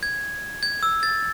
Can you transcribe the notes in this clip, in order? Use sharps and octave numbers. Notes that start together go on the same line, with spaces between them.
G#6
G#6
E6
A6